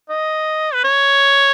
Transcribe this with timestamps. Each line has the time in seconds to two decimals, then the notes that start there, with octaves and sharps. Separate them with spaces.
0.09 D#5
0.74 B4
0.84 C#5